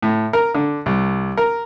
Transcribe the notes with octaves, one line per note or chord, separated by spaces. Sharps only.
A2
A#4
D3
C2
A#4